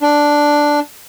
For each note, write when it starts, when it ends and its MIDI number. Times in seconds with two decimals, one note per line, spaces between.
0.02 0.80 62